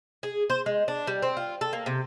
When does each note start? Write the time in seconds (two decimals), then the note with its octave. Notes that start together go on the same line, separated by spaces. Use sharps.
0.23 G#4
0.50 C5
0.66 G#3
0.88 D4
1.07 G3
1.22 C4
1.37 F4
1.61 A4
1.73 A#3
1.86 C3